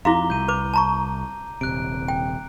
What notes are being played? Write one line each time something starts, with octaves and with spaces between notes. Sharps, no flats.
F2 E4 F#4 F5 A#5 D6 G7
C2 G6 D#7
B4 D6
A5 A#5 C#6
D#1 C3 F#6 D7
G5